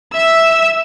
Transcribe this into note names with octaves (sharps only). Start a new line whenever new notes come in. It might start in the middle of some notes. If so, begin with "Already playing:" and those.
E5 E6